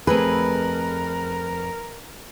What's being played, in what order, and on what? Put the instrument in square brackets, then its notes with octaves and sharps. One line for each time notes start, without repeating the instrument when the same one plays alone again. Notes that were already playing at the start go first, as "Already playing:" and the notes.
[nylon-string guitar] F2 A3 G#4 [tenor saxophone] A#4 [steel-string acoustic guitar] B4